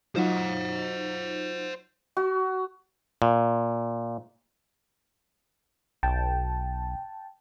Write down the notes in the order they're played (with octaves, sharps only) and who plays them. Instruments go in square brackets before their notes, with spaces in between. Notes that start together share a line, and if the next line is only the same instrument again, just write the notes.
[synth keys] F#3 D#4 F4 [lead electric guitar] C5 F#5
[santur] F#4
[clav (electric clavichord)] A#2
[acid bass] B1 [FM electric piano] G5 A5